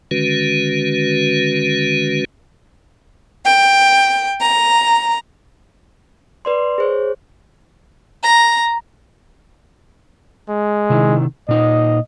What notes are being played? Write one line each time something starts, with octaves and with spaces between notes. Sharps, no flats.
D3 D#3 G#3 C#4 F#4 B4
G5
A#5
B4 D5 C6
G#4 C5 C#5
A#5
G#3
C3 D#3 E4
A#2 D#4 D#5